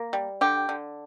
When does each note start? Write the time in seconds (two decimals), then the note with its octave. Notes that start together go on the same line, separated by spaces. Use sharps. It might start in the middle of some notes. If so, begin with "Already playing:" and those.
Already playing: A#3
0.13 G3
0.41 D3 G4
0.69 D3